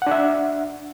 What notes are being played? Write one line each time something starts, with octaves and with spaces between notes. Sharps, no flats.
D4 E5 F#5